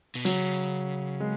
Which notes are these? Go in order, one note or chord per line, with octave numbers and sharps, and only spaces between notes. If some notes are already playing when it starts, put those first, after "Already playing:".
B2
C#3 F#3
G#3